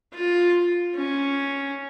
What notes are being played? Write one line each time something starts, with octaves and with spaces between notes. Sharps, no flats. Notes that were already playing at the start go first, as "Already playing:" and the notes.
F4
C#4